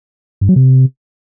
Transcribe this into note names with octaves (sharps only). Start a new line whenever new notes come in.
G2
F#3
C3